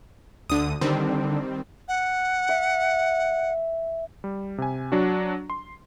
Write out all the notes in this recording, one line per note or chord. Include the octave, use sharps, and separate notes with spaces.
D2 D3 D#6
D3 D#3 G3 C4
F#5
E5
G3
C3 G#5
F#3 D4 F#4
C6